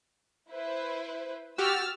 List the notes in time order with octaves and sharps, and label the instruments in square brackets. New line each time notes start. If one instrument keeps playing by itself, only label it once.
[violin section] E4 B4 C5
[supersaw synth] F#4 G4 [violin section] E6 F6 A6